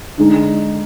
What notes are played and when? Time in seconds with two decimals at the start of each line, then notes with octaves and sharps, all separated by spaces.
0.18 D3 G#3 D#4